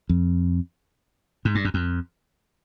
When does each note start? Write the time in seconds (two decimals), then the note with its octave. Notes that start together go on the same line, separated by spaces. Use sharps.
0.09 F2
1.45 G#2
1.55 G2
1.65 F#2
1.74 F2